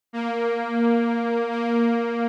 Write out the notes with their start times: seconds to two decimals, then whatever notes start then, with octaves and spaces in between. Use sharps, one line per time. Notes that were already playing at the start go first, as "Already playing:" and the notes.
0.13 A#3
1.52 A#3